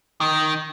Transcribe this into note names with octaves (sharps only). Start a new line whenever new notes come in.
D#3